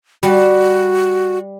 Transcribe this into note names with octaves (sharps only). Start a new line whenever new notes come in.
G3 F#4